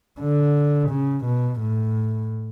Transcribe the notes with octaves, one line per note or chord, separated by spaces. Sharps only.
D3
C#3
B2
A2